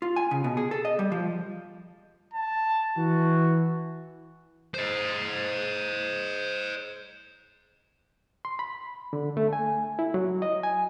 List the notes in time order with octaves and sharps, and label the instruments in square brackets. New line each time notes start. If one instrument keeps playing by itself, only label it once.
[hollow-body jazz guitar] F4
G#5
C#3
B2
G#4
A4
D#5
G3
F3
[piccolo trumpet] A5
[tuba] E3 [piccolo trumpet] F#4
[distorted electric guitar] C5 D#5
[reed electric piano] C6
B5
D3
A3
G#5
E4
F#3
D#5
G#5